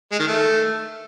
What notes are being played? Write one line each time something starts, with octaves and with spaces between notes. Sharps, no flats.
G#3
D#3
A3